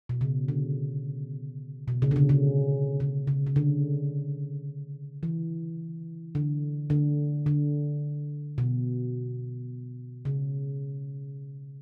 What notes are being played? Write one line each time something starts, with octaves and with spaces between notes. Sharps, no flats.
B2
C#3
D3
B2
C#3
D3
C#3
C#3
C#3
C#3
C#3
D3
E3
D3
D3
D3
B2
C#3